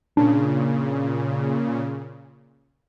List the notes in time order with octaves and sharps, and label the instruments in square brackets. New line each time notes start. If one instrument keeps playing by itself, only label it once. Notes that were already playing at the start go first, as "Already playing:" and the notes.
[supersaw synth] A#2 C#3 [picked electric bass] D4